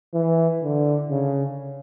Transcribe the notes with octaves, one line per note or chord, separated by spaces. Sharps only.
E3
D3
C#3